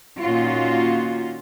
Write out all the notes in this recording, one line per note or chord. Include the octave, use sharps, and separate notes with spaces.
A#2 D#3 C#4 F4 F#4